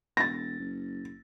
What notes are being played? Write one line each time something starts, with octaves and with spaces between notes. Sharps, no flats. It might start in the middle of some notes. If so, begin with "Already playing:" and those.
E1 A6 A#6
F#1